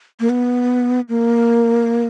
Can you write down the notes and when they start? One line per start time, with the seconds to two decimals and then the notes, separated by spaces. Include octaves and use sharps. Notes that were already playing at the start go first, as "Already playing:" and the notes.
0.20 A#3
0.29 B3
1.09 A#3